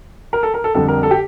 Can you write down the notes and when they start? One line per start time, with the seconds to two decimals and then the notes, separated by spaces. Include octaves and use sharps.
0.33 A#4
0.43 A4
0.54 A#4
0.64 A4
0.74 F2 D3 G3 A4
0.88 A#4
1.03 A4
1.11 G4